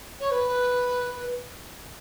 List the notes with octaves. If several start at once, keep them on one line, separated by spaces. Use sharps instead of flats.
C#5
B4